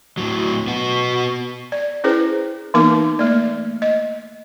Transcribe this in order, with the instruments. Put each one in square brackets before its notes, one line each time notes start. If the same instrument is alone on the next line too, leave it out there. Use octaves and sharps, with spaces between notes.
[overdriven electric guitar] A2 F#3
B3 F#4
[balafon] D5
C#4 E4 G#4 B4 C5
E3 A#3 B3 D#4 A#4 D6
A3 A#3 D5
D#5